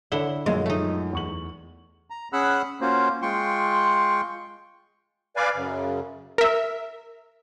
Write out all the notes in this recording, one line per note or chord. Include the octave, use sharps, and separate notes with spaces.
D3 E4 C#5 F#5 G7
F#2 A#2 F3 G#3
A3 D#4
E2 C#6 F#7
A#5
C#4 G#4 F#5 B5 E6 F#6
A#3 C#4 F4 F#4 C5
G#3 F4 G5 C6 C#6
B4 D5 F5 G#5
F#2 C#3
A#4 E5